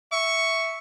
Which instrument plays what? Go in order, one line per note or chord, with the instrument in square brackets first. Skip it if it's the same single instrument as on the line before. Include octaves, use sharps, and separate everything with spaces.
[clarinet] E5 [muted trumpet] C#6